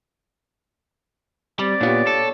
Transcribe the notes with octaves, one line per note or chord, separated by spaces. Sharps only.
G3 C4 D5
A#2 B3 D4 F4 G4 C#5
A4